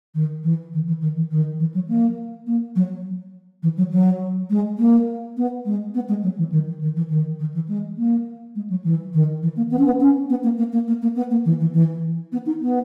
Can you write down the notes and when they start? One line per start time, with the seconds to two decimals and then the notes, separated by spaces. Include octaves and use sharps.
0.14 D#3
0.43 E3
0.73 D#3
0.86 E3
1.01 D#3
1.16 E3
1.31 D#3
1.59 E3
1.74 F#3
1.88 A#3
2.46 A#3
2.75 F#3
3.63 E3
3.77 F#3
3.91 F#3
4.50 G#3
4.78 A#3
5.37 B3
5.65 G#3
5.94 B3
6.08 G#3
6.23 F#3
6.38 E3
6.52 D#3
6.67 E3
6.81 D#3
6.96 E3
7.10 D#3
7.39 D#3
7.54 E3
7.68 G#3
7.97 A#3
8.55 G#3
8.70 F#3
8.84 E3
9.13 D#3
9.42 E3
9.56 A#3
9.71 B3
9.79 C#4
9.85 B3
10.00 C#4
10.29 B3
10.43 A#3
10.58 A#3
10.72 A#3
10.87 A#3
11.02 A#3
11.16 B3
11.30 A#3
11.45 E3
11.60 E3
11.73 E3
12.32 B3
12.46 D#4
12.61 B3